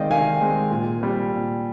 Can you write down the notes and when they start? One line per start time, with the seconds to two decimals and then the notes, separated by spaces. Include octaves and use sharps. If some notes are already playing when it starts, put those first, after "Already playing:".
Already playing: D#3 G#3 C4 D5 D#5 F5 G5
0.10 D#3 F5 G#5
0.41 G#3 C4
0.71 A#2
1.00 G3 C4
1.30 A#2